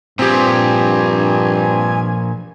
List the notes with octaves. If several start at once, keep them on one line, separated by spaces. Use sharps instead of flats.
G2 A#2 F3 C4 G4 G#5